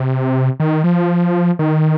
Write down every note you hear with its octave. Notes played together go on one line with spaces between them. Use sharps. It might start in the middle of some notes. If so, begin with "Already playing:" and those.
Already playing: C3
D#3
F3
D#3